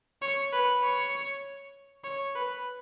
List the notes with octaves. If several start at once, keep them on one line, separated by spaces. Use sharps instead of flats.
C#5
B4
C#5
C#5
B4